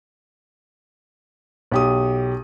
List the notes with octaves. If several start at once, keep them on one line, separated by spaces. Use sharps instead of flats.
B1 G4 D#6